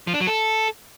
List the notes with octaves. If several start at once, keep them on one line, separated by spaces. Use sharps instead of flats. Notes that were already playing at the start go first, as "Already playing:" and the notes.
F3
D4
F#3
A4